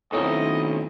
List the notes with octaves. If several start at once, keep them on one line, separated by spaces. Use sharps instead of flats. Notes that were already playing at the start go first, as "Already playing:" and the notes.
B1 D#3 A3 C4 C#4 E4 F4 D#5